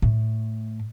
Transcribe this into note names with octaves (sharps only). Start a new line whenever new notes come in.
A2